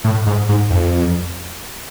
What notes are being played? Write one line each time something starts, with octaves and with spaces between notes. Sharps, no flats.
A2
G#2
G#2
F2